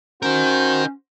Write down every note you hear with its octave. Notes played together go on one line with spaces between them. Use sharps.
C#4 D#4 F#4 A#4 C5 G6